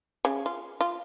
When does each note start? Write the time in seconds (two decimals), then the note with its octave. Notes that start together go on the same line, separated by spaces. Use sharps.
0.25 C#3
0.46 F4
0.81 F4